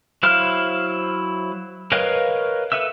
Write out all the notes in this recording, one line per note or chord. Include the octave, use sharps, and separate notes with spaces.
F#3 E4 C5 F5 F6
A#4 B4 C#5 D#5 F5
A4 B4 E5 E6